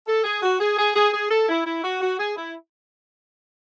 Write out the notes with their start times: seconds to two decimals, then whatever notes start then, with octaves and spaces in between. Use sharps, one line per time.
0.07 A4
0.24 G#4
0.42 F#4
0.60 G#4
0.77 G#4
0.95 G#4
1.12 G#4
1.30 A4
1.48 E4
1.65 E4
1.83 F#4
2.01 F#4
2.18 G#4
2.36 E4